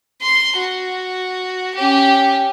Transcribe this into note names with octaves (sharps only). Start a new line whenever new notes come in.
C6
F#4
C#4 G4